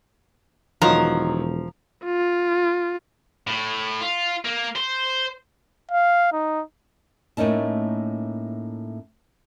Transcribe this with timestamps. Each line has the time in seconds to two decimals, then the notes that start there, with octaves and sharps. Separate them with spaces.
0.82 E1 D#3 F3 F#3 D#4 A#4
2.05 F4
3.47 A2
4.01 F4
4.45 A#3
4.76 C5
5.91 F5
6.32 D#4
7.37 A2 A3 A#3 C#4 D#4 A5